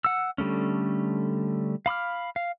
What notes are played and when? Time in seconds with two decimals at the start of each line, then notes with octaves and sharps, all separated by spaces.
0.04 F#5 E6
0.38 D3 G3 A3 C#4
1.86 F5 B5 D6 F6
2.36 F5